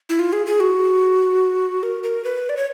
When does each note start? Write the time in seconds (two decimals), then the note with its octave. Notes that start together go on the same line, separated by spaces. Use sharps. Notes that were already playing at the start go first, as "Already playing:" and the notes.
0.09 E4
0.19 F4
0.33 G#4
0.46 G#4
0.60 F#4
1.83 A#4
2.03 A#4
2.24 B4
2.49 D5
2.57 C#5